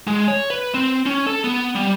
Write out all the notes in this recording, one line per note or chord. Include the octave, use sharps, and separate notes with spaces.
G#3
C#5
B4
C4
C#4
A4
B3
G3